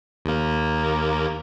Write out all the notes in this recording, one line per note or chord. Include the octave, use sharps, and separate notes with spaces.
D#2 A#3